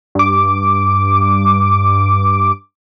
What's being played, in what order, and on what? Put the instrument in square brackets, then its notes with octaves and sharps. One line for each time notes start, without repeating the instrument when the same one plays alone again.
[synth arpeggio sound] G2 D6